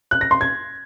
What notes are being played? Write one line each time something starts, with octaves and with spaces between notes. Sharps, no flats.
F#6
A#6
C6
G#6